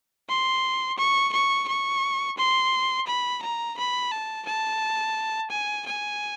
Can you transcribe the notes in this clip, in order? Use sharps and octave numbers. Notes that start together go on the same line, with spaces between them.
C6
C#6
C#6
C#6
C6
B5
A#5
B5
A5
A5
G#5
G#5